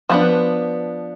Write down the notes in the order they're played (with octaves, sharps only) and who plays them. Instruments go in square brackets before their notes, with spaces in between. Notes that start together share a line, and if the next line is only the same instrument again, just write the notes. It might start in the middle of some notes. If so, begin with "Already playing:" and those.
[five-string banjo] F3 B3 D4 B4